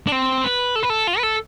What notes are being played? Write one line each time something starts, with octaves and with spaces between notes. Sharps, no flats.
D4
C4
B4
A4
B4
A4
F4
B4
A4